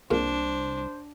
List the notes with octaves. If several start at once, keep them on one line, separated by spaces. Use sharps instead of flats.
C2 A#2 G#3 D4 C5 F5